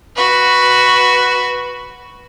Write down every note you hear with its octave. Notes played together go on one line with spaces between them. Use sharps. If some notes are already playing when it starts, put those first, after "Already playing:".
F#4 B4